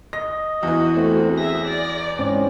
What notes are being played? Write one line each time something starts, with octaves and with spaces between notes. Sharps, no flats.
D#5 A#6
E2 E3 F#4
A3 C4
G#4 E5 A#6
D5
G#2 C4 C#4